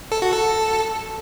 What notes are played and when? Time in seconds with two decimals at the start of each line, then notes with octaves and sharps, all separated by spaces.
0.12 A4
0.22 F#4
0.32 A4